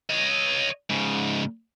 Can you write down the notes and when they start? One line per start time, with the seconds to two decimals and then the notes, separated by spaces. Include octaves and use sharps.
0.10 C#5 D#5
0.90 G#2 C#3